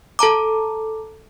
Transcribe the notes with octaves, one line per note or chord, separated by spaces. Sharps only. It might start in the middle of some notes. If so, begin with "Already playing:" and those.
A4 A5 A#5 D6